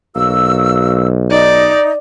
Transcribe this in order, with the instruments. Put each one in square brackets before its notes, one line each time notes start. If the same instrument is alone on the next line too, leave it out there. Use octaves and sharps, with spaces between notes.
[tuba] B1 [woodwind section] A#3 F#4 E6
[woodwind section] D#4 [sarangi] D5